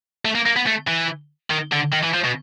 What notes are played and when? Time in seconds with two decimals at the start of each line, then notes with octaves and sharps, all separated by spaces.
0.25 A3
0.35 A#3
0.46 A#3
0.57 B3
0.67 A3
0.88 E3
1.50 D#3
1.72 D3
1.92 D#3
2.03 E3
2.14 F3
2.24 B2